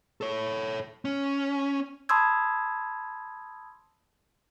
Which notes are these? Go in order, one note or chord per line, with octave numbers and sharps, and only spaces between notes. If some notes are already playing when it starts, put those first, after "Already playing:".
A4 C#5
C#4
A5 B5 C6 D#6 E6 G#6